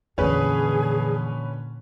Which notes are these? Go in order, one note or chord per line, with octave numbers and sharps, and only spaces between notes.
F2 A#2 D3 E3 C#4 G#4 B4